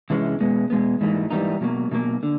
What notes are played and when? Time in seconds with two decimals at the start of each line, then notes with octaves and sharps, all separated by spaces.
0.10 C3 E3 G#3 C#4
0.40 B2 G#3 B3
0.70 B2 G#3 B3
1.01 G#2 E3 G3 A#3 D#4
1.30 G#2 E3 G3 A#3 D#4
1.61 B2 F#3 A#3
1.92 B2 F#3 A#3
2.23 D3